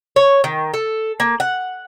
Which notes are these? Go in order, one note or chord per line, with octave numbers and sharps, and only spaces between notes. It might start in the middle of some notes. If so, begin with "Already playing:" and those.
C#5
D#3
A4
A#3
F#5